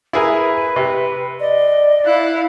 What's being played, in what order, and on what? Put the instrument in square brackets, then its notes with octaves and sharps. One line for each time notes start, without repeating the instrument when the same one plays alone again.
[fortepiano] E4 G#4 A#4 [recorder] B4
[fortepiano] C3
[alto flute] D5 [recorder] D#5
[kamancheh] E4 F5 [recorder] F#6